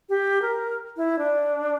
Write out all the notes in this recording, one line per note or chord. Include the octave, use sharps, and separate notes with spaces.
G4
A#4
E4
D4